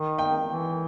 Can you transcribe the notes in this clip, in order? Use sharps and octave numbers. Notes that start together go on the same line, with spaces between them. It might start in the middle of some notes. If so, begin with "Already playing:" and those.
Already playing: D#3
G5
E3